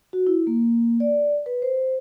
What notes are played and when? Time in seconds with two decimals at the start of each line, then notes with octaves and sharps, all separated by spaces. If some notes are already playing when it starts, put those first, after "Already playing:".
0.13 F#4
0.27 E4
0.47 A#3
1.00 D5
1.46 B4
1.62 C5